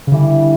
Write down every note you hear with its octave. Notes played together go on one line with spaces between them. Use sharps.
C#3
G2 D3 E3 G3